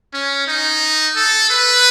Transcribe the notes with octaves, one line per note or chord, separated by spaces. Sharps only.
C#4
D#4
A4
B4